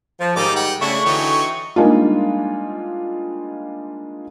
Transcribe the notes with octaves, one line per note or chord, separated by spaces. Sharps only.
F3
G#2 D#3 G3 D#4 D6
F#5 G5
C#3 A3 D4 E4 C#6
D3 E3 F#3 D#4 G5
C#6
G3 G#3 A#3 D4 D#4 F4